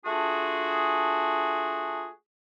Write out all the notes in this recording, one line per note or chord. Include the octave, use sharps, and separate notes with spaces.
A3 D4 F4 F#4 G#4